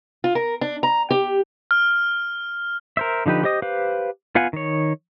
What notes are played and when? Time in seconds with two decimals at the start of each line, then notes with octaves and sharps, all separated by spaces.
0.24 F4
0.35 A#4
0.61 D4
0.83 A#5
1.10 G4
1.71 F6
2.97 A#4 C5 E5
3.26 D3 F3 D#4 G4 B4
3.43 G4 C5 D#5 D#6
3.62 G4 B4 C5 F5
4.35 B3 F4 F5 F#5 G#5
4.53 D#3 C#5